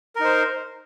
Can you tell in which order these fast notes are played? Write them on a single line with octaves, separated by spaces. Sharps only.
A#4 D#4 C5